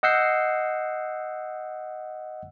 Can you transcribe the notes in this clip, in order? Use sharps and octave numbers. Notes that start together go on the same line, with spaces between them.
D#5 F#5 E6 G6 C7